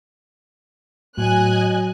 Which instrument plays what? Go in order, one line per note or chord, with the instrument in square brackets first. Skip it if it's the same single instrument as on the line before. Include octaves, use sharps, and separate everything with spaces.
[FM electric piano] A2 [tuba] F#3 [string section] D#5 G#5 F#6